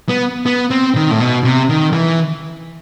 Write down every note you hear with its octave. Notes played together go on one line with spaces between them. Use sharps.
B3
B3
C4
D#3
A2
B2
C3
D#3
E3